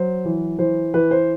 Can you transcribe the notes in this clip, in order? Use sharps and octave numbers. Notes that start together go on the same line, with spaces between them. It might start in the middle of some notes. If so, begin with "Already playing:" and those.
Already playing: F#3 C5
E3
E3 C5
E3 B4
C5